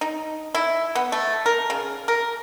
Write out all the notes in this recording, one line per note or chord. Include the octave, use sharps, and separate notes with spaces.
D#4
E4
B3
A3
A#4
C#3
A#4